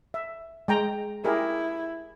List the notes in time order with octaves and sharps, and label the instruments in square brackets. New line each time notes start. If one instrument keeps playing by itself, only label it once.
[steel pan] E5
G#3 G5 A#5
[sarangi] E4 [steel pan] G4 G#4 A#4